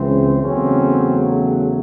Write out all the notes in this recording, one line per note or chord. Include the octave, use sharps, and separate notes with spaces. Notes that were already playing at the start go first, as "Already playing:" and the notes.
Already playing: C#2 C#3 E3 C4
E2 C#3 F#3 A3 C4 C#4